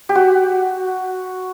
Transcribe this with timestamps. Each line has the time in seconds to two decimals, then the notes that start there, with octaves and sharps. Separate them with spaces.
0.09 G4
0.15 F#4